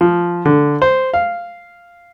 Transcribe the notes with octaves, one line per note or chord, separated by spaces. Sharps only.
F3
D3
C5
F5